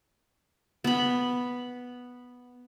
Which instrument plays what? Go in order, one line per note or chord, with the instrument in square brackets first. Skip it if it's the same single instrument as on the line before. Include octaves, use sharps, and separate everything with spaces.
[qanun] B3 B5